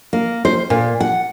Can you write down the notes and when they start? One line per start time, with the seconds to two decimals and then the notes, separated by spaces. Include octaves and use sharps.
0.13 A#3
0.45 C5
0.70 A#2
1.00 F#5